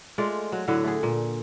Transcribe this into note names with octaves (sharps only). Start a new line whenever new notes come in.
G#3 A3 F4 D5
F#3
A2 D3 F#3
A3 G#4
A#2